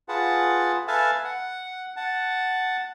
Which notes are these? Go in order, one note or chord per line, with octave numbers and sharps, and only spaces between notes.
F4 G#4 B4 F#5 A5
A4 B4 E5 F5 G#5 A5
F#5
F#5 A5